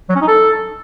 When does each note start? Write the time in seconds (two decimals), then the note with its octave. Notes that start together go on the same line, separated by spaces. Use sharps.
0.09 F#3
0.15 C#4
0.21 D#4
0.27 A4